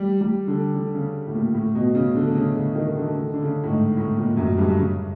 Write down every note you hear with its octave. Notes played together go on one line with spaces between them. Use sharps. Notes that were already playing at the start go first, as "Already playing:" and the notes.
Already playing: G3
G3
D3
D3
C#3
A2
A#2
A2
B2
C#3
D3
C#3
C#3
D#3
D3
D3
D3
C#3
A2
G#2
A2
A#2
F#2
G2
C#3